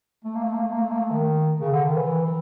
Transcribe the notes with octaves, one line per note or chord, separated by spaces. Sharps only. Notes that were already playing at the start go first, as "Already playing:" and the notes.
A3
A#3
A3
A#3
A3
A#3
A3
A#3
A3
D#3
C#3
D3
D#3
E3
E3